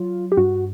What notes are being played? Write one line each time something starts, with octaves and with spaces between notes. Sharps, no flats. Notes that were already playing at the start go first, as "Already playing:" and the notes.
Already playing: F#3 F4
G4
G2 F#4